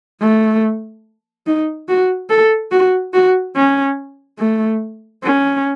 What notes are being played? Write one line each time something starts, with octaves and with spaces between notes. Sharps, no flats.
A3
D#4
F#4
A4
F#4
F#4
C#4
A3
C#4